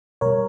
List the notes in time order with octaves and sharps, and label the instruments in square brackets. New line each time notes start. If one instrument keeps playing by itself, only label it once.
[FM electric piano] B2 G3 A#4 C#5